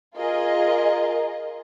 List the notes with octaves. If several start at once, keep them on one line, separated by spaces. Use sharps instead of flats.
F4 G#4 A#4 D#5